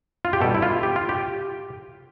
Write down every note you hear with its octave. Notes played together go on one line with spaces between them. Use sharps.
F4
G4
B2 G3 A4
E4
F4
G4
F4
G4